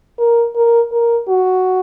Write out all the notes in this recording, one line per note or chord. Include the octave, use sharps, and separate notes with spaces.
A#4
A#4
A#4
F#4